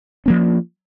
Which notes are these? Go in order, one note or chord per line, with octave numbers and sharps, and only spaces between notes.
F3 A#3 C#4